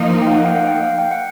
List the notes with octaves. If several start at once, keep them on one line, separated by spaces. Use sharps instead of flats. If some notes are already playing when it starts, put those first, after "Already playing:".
Already playing: F3 A#3 D#4
G5
F5
F#5
G5
F5
F#5
G5
F5
G5
F#5